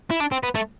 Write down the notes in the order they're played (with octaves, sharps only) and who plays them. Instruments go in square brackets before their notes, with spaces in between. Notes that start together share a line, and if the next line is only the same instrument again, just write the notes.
[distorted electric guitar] E4
D4
C4
B3
A3